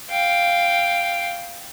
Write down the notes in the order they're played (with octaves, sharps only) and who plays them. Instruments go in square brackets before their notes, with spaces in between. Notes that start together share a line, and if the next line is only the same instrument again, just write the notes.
[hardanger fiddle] F5 G5